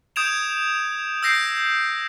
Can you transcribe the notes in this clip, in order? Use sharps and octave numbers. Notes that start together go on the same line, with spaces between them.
D#6 G6 G#6 D7 E7 F7
E6 G6 A#6 C7 D7